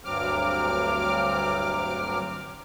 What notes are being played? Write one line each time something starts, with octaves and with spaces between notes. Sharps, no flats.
D2 G2 F#3 C4 D6 F6